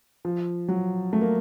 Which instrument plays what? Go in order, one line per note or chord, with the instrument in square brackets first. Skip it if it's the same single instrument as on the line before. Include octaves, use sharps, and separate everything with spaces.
[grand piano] F3
F#3
A3
A#3